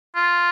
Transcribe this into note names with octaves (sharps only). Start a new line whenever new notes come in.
F4